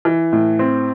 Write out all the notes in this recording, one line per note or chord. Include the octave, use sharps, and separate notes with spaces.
E3
A2
C4